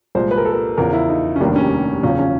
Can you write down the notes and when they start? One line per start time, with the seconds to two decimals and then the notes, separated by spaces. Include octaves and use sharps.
0.15 C2 A#2 F3 G#3 C5
0.31 B4
0.37 A#4
0.45 A4
0.52 A#4
0.77 E2 C#3 F3 A#4
0.93 E4
1.09 D#4
1.36 C#4
1.40 F1 D#2 D#3 G3 A#3 D4
1.56 C#4
2.03 F#1 E2 C#3 F3 C#4
2.19 C#4